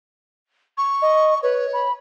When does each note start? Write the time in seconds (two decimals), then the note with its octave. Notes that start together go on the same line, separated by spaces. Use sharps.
0.77 C#6
1.02 D#5
1.42 B4 C#5
1.73 B5